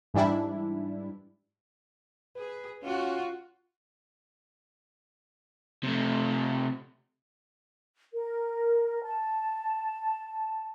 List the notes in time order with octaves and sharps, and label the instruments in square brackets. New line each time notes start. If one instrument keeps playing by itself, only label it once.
[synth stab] G#2 E3 G3 D4 E4
[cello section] G#4 [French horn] B4
[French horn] C#4 [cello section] F4 F#4
[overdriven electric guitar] C3 A3
[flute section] A#4
A5